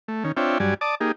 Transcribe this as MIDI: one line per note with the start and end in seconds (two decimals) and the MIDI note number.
0.08 0.24 57
0.24 0.32 51
0.24 0.32 61
0.37 0.58 60
0.37 0.58 62
0.37 0.58 65
0.37 0.58 73
0.37 0.58 76
0.37 0.58 79
0.60 0.74 43
0.60 0.74 54
0.60 0.74 55
0.60 0.74 74
0.60 0.74 80
0.81 0.95 74
0.81 0.95 81
0.81 0.95 86
0.81 0.95 87
1.01 1.12 58
1.01 1.12 63
1.01 1.12 67
1.01 1.12 68